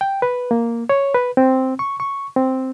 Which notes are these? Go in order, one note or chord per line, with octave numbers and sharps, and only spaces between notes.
G5
B4
A#3
C#5
B4
C4
C#6
C#6
C4